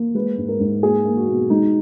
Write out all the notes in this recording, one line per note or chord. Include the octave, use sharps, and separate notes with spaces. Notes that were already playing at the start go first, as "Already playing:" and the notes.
Already playing: A#3
G#3 B4
G#2
A#4
G#2
A#3 G#4
A#3
F#4
B2
G#3 D#4